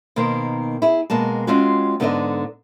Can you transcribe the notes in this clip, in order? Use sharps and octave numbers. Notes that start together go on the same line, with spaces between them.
B2 D#3 A#3 C5
E4 G#4
B2 G#3 A#3 A5
G#3 C4 C#4 F4 F#4
G#2 D3 B3 A4 D5 D#5